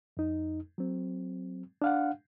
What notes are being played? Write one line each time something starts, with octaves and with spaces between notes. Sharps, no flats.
F2 D#4
F#3 C4
D4 F5 F#5